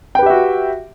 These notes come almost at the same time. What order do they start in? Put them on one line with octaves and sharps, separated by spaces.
G5 B4 G4 E5 F#4